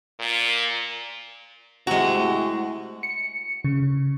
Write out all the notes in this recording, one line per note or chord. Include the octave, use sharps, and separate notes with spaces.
A#2
C3 G#3 A3 E4 F#4 G#5 A#5
C#7
C#3